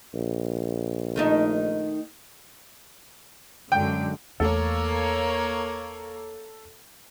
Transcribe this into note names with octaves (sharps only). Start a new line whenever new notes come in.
A#1
D#3 A3 D#4
F#2 D3 G#3 G5
E2 A3 A#3 A4 C#5